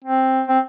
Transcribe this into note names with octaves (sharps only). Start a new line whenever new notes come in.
C4
C4